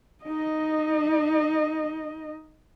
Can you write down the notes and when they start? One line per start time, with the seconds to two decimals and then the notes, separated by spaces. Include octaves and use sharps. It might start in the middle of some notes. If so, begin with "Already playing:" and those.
0.25 D#4 D#5